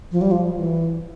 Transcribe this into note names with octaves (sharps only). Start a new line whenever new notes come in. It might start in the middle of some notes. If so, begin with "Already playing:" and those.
F3
G3
F3
E3